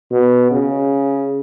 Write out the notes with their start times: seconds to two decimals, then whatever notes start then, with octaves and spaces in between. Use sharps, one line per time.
0.11 B2
0.51 C#3